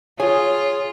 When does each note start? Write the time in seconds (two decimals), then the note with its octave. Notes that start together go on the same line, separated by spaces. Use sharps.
0.20 F4 G#4 C#5